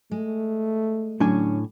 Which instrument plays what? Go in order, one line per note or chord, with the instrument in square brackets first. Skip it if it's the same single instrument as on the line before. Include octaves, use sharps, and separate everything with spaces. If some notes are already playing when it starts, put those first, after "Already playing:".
[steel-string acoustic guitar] G#3 [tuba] A3
[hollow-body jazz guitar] A2 D4 G#5 [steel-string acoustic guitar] D3 F#3 C#4